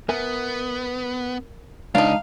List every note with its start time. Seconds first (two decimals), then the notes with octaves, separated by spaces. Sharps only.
0.09 B3 A#4 E5 G#5
1.95 C#2 G#3 D4 D#4 F5